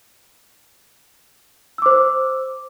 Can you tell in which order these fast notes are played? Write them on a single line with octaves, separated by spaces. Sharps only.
E6 D6 C5